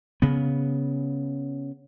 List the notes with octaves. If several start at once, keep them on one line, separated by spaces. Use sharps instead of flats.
C#3 B3